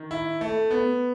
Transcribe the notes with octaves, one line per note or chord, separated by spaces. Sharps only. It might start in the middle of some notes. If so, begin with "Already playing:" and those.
Already playing: D#3
E4
A3
B3